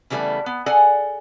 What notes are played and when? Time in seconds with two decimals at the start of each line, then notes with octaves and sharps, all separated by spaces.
0.10 C#3 E3 G3 A3 B3
0.46 B3
0.66 G#4 A4 D5 F#5 G#5